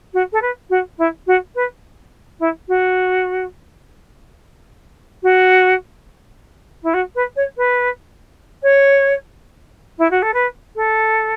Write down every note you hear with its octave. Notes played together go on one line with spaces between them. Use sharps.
F#4
A4
B4
F#4
E4
F#4
B4
E4
F#4
F#4
E4
F#4
B4
C#5
B4
C#5
E4
F#4
A4
B4
A4